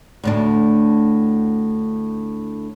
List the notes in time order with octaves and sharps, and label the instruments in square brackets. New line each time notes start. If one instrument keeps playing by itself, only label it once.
[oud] D2 A2 D4